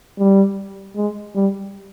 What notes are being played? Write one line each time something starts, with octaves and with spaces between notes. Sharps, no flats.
G3
G#3
G3